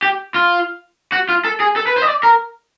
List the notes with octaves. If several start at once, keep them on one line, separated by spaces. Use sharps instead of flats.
G4
F4
F#4
F4
A4
G#4
A4
B4
C5
D#5
D5
A#4